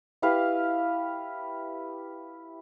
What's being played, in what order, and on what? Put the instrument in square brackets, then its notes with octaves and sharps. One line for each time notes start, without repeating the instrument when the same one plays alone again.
[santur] E4 G4 B4 F5